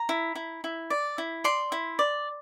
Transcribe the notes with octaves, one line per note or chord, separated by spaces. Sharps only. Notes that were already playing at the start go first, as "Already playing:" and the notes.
Already playing: A#5
E4
E4
E4
D5
E4
D5 C6
E4
D5